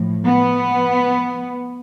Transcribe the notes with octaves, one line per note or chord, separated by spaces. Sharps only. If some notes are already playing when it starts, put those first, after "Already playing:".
Already playing: A2 F3
B3